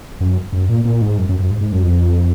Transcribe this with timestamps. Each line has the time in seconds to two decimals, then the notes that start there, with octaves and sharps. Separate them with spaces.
0.21 F#2
0.53 F#2
0.69 A#2
0.85 A#2
1.01 G#2
1.18 F#2
1.29 F#2
1.40 F#2
1.51 G#2
1.61 G#2
1.72 F#2
1.82 F2